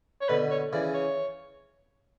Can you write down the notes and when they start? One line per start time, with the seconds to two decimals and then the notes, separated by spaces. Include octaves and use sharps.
0.21 C#5
0.29 B2 D3 B4
0.51 C#5
0.73 C#3 E3 D5
0.94 C#5